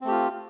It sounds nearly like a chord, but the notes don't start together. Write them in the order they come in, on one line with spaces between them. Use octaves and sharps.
C4 A3 G4 F4